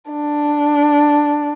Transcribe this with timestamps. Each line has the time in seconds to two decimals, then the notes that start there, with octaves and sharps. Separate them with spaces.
0.11 D4